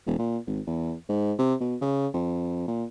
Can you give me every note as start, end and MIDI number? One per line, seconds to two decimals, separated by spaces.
0.06 0.15 28
0.19 0.38 46
0.47 0.60 32
0.67 0.93 40
1.09 1.33 44
1.39 1.55 48
1.61 1.76 47
1.81 2.08 49
2.14 2.66 41
2.68 2.85 46